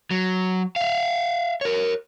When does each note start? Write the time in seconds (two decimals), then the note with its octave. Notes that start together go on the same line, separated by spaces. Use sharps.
0.11 F#3
0.76 E5 F5
1.61 A#4 C#5